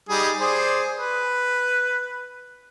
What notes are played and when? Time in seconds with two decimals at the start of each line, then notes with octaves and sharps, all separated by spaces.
0.09 G3 D#4 G#4
0.40 G#4 C5 D5
0.96 B4